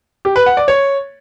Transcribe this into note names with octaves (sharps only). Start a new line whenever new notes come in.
G4
B4
F#5
D5
C#5